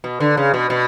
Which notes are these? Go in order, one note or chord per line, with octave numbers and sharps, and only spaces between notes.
B2
D3
C#3
B2
B2